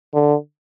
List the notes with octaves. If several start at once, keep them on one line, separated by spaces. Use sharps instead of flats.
D3